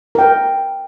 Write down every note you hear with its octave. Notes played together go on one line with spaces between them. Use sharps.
A#4 G5